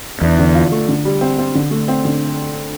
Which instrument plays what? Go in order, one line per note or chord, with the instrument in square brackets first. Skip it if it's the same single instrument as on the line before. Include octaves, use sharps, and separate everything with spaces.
[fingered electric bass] E2 [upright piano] D4
[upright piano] D3
F4
A3
D3
G3
C4
C4
D3
A3
C4
D3